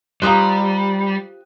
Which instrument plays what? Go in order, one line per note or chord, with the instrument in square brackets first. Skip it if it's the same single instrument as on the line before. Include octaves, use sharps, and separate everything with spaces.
[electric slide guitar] G3 [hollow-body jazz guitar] F4 G4 C5 [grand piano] A#5 D#6 F#6